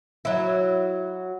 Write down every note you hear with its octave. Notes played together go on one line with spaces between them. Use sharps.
F#3 E4